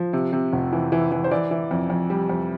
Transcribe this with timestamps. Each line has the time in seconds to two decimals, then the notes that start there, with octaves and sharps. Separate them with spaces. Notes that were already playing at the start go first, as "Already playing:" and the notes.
Already playing: F3
0.13 C3
0.33 C3
0.53 F1
0.73 E3
0.92 E3
1.12 E3
1.24 C5
1.31 E3 D5
1.51 E3
1.71 F2
1.90 F2
2.10 G3
2.29 F2